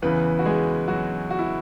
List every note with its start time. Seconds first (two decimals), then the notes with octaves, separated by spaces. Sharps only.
0.02 E2 C#3 E3 B3 B4
0.39 F#4
0.45 G#3 G#4
0.88 F#3 F#4
1.31 F#4
1.39 E4